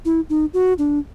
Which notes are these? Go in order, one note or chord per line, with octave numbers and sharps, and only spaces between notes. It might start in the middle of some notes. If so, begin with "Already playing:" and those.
E4
D#4
F#4
D4